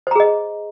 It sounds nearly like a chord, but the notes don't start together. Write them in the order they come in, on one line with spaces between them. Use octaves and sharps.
C5 A#5 G#4 D#5